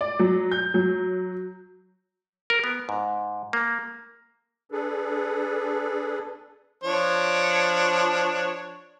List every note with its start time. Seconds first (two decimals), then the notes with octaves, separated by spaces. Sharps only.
0.01 D5
0.19 F#3
0.51 G6
0.74 F#3
2.50 A#4
2.64 B3
2.89 G#2
3.53 A#3
4.72 D4 G#4 A4 B4
6.83 F3 D4 C#5